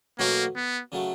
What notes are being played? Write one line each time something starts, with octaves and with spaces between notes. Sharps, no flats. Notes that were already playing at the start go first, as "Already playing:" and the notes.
B2 F#3 A3 A#3 C#4 F#4
B3
C#3 F#3 A3